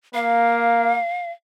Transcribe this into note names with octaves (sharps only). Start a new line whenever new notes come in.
A#3 F5